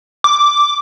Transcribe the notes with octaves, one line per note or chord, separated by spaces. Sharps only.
D6